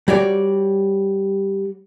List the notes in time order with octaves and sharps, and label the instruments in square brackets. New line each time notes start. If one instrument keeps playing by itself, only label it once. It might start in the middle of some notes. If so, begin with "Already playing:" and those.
[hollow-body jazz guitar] G3 F#4 C#5 D5